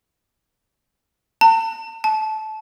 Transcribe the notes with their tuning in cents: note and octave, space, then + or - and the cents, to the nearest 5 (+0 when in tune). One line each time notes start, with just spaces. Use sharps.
A5 +40
A5 -20